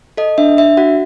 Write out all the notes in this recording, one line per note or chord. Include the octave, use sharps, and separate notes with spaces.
A4 D#5
D4 E5
D4 E5
F#4 F#5